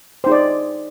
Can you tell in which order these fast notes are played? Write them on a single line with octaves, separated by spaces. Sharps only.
C5 D#4 G#4 D5